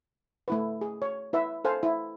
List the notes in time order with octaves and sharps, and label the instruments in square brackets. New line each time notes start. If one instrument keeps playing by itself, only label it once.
[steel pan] A3 E4 B4
G#4
C#5
E4 B4 E5
A4 C5 F5 G#5
E4